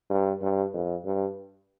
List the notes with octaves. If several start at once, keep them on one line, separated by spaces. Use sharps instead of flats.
G2
G2
F2
G2